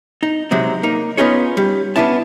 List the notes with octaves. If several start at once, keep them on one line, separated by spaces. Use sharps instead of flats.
D#4
C3 F#3 G#3 C4
A#3 D#4
B3 C#4 D#4 F4 G#4 C#5
G3
B3 C#4 D4 E4 A5